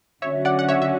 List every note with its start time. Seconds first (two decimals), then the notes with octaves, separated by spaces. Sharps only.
0.22 D3 F#3 C#4 F#4 C#5 E5
0.45 D5 F#5
0.59 F#5
0.69 C#5 E5
0.82 E5